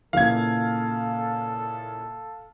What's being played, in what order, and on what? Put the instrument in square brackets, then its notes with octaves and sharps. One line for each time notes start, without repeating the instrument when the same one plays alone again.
[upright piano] A#2 C#3 E3 [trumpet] A4 [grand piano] F5 G#6